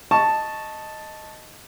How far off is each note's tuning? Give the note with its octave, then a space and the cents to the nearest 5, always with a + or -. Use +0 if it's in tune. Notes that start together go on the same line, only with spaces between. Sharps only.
D#5 +0 A5 +0 C#6 +0